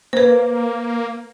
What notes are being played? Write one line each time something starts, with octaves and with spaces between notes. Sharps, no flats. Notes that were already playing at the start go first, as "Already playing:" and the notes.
A#3 B4 C5